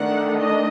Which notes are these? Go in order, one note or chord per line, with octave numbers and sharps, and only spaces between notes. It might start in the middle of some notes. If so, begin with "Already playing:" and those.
Already playing: D#3 A3 D4 F#5
D#5